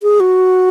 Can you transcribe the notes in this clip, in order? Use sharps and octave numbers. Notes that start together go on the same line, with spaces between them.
G#4
F#4